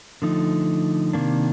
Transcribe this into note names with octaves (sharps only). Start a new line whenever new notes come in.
D3 F3 A3 D#4
C3 D#3 A#3 D4